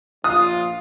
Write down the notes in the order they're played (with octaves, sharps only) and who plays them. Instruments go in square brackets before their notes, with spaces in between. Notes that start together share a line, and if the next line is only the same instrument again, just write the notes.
[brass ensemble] A#1 F4 [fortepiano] D#6